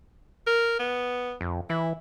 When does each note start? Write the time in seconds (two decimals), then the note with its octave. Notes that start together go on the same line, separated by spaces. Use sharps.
0.47 A#4
0.79 B3
1.41 F2
1.70 E3 E4